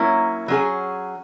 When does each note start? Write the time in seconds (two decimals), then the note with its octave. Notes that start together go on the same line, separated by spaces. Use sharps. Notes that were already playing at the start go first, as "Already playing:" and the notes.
Already playing: F#3 A#3 C#4 E4
0.48 F#3 C#4 G#4